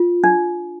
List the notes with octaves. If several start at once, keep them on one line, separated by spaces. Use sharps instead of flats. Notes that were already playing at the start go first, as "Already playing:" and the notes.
Already playing: F4
D4